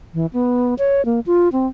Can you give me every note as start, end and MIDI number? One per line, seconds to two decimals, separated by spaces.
0.14 0.26 52
0.33 0.75 59
0.78 1.04 73
1.05 1.20 58
1.26 1.49 65
1.52 1.67 60